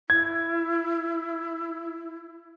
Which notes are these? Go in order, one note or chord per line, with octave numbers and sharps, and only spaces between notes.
E4 G#6